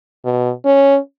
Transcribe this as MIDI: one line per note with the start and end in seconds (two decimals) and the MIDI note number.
0.25 0.51 47
0.65 0.98 61